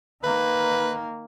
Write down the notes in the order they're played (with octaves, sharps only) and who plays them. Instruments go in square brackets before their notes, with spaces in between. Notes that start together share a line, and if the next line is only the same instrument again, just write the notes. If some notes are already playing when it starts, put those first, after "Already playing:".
[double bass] D#3 A#3 [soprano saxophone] B4